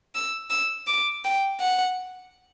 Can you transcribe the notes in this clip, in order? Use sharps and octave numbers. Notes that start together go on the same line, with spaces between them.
E6
E6
D6
G5
F#5